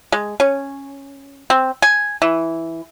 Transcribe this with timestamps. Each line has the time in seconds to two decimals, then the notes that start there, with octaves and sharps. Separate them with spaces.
0.12 G#3
0.40 C#4
1.50 C4
1.82 G#5
2.22 E3